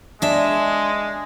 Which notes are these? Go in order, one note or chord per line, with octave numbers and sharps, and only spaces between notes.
G#3 D4 E5